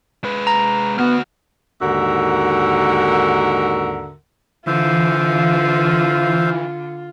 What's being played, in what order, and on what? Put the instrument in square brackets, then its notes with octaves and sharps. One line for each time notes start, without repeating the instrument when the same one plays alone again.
[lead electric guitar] G#3 B4
[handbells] A#5
[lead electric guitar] D2 F#4 [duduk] B3 [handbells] F6
[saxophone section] D#2 G#2 D3 F#4 A#4 E5
[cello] D3 [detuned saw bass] E3 [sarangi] F4 [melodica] C5 E5 F5